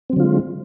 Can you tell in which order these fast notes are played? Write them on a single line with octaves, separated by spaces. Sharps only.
C4 F#3 D3 F4 G#3